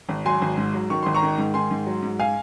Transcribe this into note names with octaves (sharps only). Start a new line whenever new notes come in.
G#1
F#3 G#5 C6
G#1
G#2
F#3
D#3 C#6
G#1 C6
A#5 C#6
D#3
G#2
D#3 G#5 C6
G#2
F#3
G#2
F5 G#5